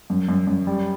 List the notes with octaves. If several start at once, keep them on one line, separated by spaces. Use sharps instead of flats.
F#2
F#2
F#2
G3